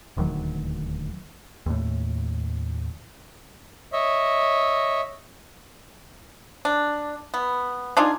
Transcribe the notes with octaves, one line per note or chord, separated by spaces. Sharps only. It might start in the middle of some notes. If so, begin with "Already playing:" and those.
D#1 D2 D#3 F#3
D#2 A2
C#5 D#5 E5
D4
B3
D4 D#4 F4 G#4